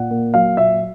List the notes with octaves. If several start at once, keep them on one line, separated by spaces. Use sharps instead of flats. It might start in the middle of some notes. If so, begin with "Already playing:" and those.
Already playing: A#2 F#5
A#3
F#3 F5
A#2 E5